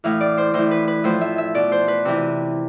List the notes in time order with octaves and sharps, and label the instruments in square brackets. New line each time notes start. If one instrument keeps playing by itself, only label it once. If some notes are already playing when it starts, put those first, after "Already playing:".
[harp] A2 E3 F5
D5
C5
A2 E3 C5
B4
B4
A2 F3 C5
E5
E5
B2 D5
C5
B4
C3 E3